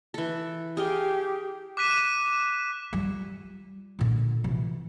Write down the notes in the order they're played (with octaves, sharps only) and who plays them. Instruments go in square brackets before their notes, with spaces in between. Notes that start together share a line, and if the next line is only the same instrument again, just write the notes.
[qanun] E3 A4
[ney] G4 [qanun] G#4 F5 G5
[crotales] D6 F#6 B6 D#7 E7
[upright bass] G3 F4
A#2 D3
C3 E3